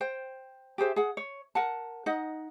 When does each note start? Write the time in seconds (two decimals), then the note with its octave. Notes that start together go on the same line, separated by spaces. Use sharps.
0.01 C5 G5
0.78 G4 G#4 C5 E5
0.96 G#4 F#5
1.17 C#5
1.55 A#4 F#5 A5
2.06 D#4 D#5 F#5